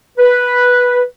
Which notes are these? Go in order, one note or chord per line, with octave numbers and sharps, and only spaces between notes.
B4